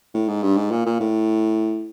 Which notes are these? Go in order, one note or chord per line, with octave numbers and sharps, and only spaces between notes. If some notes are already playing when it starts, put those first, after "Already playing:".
A2
G#2
G2
G#2
A#2
A#2
A2